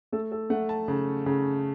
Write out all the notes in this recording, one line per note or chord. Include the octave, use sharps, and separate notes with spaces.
A3 A4
A4
A3 F#5
A5
C#3
C#3